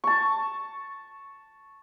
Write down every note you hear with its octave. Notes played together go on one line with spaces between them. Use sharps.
A5 C#6